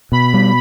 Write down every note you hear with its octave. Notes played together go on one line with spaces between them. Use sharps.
B2 B5
G3